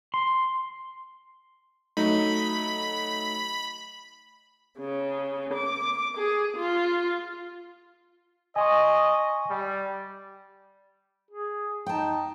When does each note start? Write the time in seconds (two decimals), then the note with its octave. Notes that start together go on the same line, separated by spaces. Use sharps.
0.14 C6
1.97 F#3 A3 D#4 B5
4.77 C#3
5.52 D6
6.17 G#4
6.55 F4
8.56 D#5 G#5 C6 C#6
9.50 G3
11.31 G#4
11.86 D#4 G5 A5